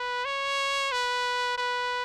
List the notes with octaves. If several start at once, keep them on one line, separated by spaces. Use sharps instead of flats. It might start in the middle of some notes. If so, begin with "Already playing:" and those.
Already playing: B4
C#5
B4
B4